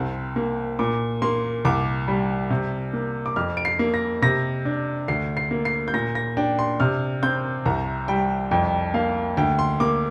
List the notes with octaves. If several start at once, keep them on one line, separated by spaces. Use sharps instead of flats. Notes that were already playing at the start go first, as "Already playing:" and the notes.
Already playing: C2 C4
A#3
A#2 D6
A#3 C6
C2 D6
G3
C3
A#3
D6
F2 F6
D7
C7
A#3
A#6
C3 A#6
D4
D2 C7
C7
A#3
C7
G6
A#2 A#6
A#6
D4 G5
C6
C3 F6
C4 G6
C2 A#5
G3 G5
F2 G5
A#3 F5
D2 G5
C6
A#3 D6